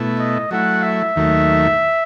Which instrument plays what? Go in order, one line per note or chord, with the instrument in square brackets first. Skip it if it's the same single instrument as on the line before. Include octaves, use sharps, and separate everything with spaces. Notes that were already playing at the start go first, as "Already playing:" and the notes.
Already playing: [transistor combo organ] B2 A3 E4
[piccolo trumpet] D#5
[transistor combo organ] F#3 A3 E4 [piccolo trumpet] F#5
[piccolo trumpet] E5
[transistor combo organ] D#2 D#3 F#3 A3